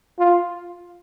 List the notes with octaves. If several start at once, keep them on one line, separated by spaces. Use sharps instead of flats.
F4